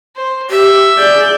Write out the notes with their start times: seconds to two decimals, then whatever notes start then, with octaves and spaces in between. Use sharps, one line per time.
0.16 C5
0.50 G4 E5
0.98 G#4 D5 G6